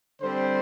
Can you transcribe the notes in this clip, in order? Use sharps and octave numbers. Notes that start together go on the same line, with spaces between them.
D3 G3 C4 C5